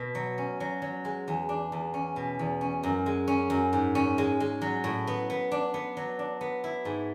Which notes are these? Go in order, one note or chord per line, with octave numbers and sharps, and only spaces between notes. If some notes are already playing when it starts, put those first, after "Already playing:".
Already playing: B2
F#3
C#4
F#3
F#3
G#3
E2
D4
E2
C#4
B2
E2
C#4
F#2
G#3
C#4
F#2
G#2
C#4
G#3
G#3
F#3
A2
B3
B3
D4
B3
F#3
D4
B3
E4
G#2